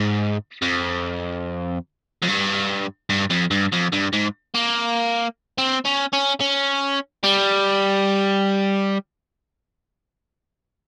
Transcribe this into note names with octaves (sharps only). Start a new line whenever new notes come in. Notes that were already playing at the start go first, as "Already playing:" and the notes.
Already playing: G#2
F2
F2
G2
G2
F2
G2
F2
G2
G#2
A#3
C4
C#4
C#4
C#4
G3